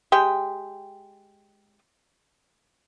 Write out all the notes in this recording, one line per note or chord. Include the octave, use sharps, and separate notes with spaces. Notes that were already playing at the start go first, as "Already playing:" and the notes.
G#3 G4 G5